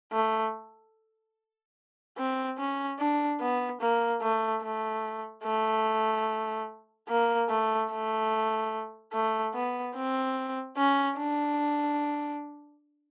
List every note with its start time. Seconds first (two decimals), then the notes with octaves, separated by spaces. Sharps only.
0.13 A3
2.17 C4
2.58 C#4
2.99 D4
3.41 B3
3.81 A#3
4.22 A3
4.63 A3
5.44 A3
7.09 A#3
7.49 A3
7.91 A3
9.13 A3
9.54 B3
9.95 C4
10.77 C#4
11.17 D4